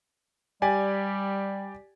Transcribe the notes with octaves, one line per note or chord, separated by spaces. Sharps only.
G3 G4 D5 G#5